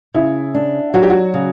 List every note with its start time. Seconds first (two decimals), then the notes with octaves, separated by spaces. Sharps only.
0.14 C#3 E4
0.55 D4
0.94 F#3 F#4
1.03 G4
1.10 F#4
1.34 C#3